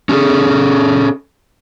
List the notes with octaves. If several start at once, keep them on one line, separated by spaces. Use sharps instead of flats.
C#4 F4 F#4 G#4 A4